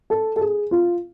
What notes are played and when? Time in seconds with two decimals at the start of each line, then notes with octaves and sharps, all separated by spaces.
0.10 A4
0.36 A4
0.41 G#4
0.71 F4